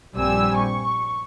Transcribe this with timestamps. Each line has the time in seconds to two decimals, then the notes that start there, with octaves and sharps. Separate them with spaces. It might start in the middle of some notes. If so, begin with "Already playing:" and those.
0.15 A#1 G2 G3 C4 G#5 E6
0.57 C#6